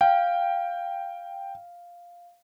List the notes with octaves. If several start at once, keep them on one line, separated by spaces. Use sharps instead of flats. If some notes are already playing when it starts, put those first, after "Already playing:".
F5 G5